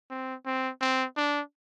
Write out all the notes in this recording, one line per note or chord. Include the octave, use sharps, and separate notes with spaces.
C4
C4
C4
D4